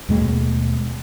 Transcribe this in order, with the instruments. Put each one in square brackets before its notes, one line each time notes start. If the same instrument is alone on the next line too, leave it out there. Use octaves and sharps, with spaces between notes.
[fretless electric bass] D#2 B2 G#3 A3